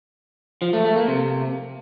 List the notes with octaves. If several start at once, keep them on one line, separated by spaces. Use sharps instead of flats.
F3
A3
A3
A#3
C3